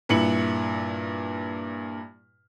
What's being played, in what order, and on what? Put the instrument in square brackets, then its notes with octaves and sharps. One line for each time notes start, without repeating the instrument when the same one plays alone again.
[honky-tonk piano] G2 A#2 E4 C#7 F#7